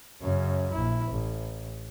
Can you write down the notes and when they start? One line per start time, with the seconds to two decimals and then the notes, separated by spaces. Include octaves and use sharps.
0.21 F#2 C#3
0.71 A#1 E4
1.11 A1